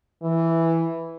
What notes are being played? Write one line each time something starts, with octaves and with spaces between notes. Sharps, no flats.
E3